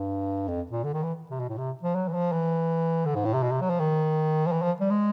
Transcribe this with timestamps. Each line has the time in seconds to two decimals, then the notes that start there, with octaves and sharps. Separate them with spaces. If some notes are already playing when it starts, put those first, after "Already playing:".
Already playing: G2
0.48 F2
0.72 A#2
0.84 D3
0.94 D#3
1.03 E3
1.31 C3
1.40 B2
1.49 A2
1.58 C3
1.83 F3
1.95 F#3
2.08 E3
2.14 F3
2.32 E3
3.06 D3
3.15 G#2
3.25 A2
3.34 C3
3.43 B2
3.52 C3
3.61 F#3
3.70 F3
3.80 D#3
4.47 F3
4.53 E3
4.62 F3
4.81 G3
4.91 G#3